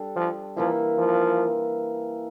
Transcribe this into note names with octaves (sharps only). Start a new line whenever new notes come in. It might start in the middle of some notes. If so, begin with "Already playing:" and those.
Already playing: G3 D4 A4
F3
E3 F3 A#3 E4
F3